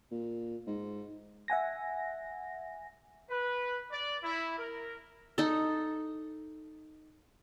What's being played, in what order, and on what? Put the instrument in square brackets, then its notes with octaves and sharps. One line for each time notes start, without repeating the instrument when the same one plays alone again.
[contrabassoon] A#2
G#2
[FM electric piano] E5 F#5 G#5 A#6
[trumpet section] B4
D5
E4
A#4
[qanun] D#4 A4